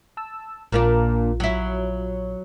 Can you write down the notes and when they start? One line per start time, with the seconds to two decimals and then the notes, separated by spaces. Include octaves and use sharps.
0.17 A5 E6
0.72 A#1 A#2 A#3 D4 F4
1.40 F#3 E4